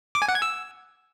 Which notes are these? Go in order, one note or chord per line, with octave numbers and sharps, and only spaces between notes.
D6
G#5
F#5
G#6
E6